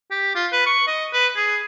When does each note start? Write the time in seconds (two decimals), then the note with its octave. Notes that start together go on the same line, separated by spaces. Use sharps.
0.11 G4
0.36 F4
0.53 B4
0.67 C#6
0.88 D#5
1.14 B4
1.36 G#4